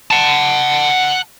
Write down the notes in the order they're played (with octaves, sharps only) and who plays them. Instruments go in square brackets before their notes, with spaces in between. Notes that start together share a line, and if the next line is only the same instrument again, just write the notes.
[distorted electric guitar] F#5 A5